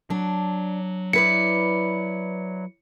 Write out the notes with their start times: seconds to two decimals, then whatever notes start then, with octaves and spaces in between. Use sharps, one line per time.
0.10 F#3 D4
1.13 E4 B4 D5 C#7